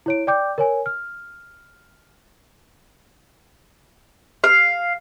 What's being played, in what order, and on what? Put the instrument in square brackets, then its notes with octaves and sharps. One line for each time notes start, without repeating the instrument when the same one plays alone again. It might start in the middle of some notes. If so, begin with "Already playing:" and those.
[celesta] E4 C#5 D7
D5 G5 D6 G6
A#4 C#5 G#5
F6
[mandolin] F5